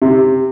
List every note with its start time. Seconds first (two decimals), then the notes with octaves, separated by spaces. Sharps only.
0.02 C3